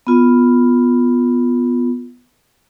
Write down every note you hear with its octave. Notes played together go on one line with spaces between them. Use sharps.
B3 F4